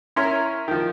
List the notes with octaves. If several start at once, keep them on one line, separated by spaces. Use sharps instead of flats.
C#4 E4 A#4 C#5 A#5 C6
D#3 F3